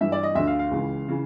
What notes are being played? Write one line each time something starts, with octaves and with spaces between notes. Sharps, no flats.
G2 E3 E5
D5
D#5
D2 D3 E5
F5
F5
C#2 C#3 E3
C#3 E3